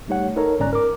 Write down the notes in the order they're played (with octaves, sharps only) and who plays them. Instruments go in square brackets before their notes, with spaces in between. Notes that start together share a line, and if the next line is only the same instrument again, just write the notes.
[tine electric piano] G3 A3 D#4 G4 C#5 F#5
D#4 A4 A#4 C#5 A#5
G1 G#2 C#4 D5 A#5 F#6
A#4 D6